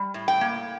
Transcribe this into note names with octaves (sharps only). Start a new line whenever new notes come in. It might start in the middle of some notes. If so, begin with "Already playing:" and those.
Already playing: G3
A2
G5
A#3